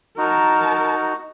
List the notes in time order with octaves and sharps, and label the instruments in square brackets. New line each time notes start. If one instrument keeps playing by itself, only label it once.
[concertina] D#4 F#4 [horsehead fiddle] A#4 A5